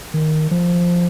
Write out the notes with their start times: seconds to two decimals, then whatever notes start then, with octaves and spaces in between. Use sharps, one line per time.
0.14 D#3
0.51 F3